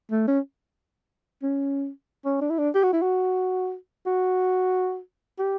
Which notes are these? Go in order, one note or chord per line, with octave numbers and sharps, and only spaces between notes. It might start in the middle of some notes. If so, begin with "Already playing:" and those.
A3
C#4
C#4
C#4
D4
E4
D4
G4
F#4
E4
F#4
F#4
G4